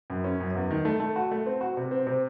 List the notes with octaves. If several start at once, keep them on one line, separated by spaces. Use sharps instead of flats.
F#2
C#4
F#2
E2
D#3
A3
A3
F#4
A3
C4
F#4
C3
C4
C3